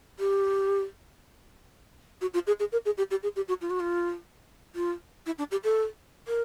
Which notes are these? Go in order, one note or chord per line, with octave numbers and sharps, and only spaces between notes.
G4
F#4
F4
G#4
G#4
A#4
G#4
G4
G4
G#4
G4
F#4
F4
F#4
F4
F4
E4
D4
G4
A4
A#4